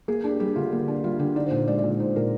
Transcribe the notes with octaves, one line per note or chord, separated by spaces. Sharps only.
A#3 G#4
D4
G4
G3 G4
D3 F4
A#3
D4
G3 F4
D3 G4
D#4 D5
C5
A#2
G#3 D5
D5
A#2
D#4 C5
A#2 A#4